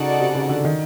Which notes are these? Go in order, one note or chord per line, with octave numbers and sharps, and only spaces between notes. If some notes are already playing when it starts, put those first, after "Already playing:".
Already playing: C#3 D#4 F#4 A4 D5 F#5
C3
C#3
D3
D#3